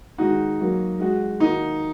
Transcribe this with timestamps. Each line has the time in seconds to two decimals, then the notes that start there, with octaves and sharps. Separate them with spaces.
0.18 D#3 G#3 D#4 F#4
0.60 F#3 A#3 F#4
1.00 G#3 F#4
1.40 D#3 A#3 D#4 F#4